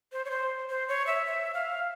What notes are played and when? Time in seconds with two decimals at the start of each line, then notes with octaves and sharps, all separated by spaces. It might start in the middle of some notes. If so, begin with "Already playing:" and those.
0.12 C5
0.25 C#5
0.31 C5
0.69 C5
0.88 C#5
1.07 E5
1.26 E5
1.54 F5